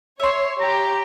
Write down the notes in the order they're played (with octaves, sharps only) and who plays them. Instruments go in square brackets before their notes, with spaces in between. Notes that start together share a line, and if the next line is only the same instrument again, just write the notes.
[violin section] C#5 [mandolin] E5 C6
[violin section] G4 [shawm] A#5